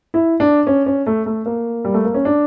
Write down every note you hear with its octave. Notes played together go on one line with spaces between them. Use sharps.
E4
D4
C#4
C#4
A3
A3
A#3
G3
A3
A#3
C#4
D4